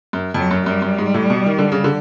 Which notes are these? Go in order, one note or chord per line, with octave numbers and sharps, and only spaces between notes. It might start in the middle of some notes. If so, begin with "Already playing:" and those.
F#2
F2 F#3
F#2
F#2 G3
F#2
G#2
A2
B2
D#3
D3
C#3
D3